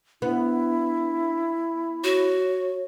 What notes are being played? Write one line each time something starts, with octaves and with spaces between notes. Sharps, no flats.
B3 D4 E4
F#4 C#5